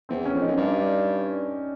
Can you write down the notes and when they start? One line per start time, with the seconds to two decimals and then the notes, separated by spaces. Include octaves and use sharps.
0.09 E2 C4
0.26 C#4
0.33 F2
0.41 D#4
0.48 F#2
0.57 G2 D4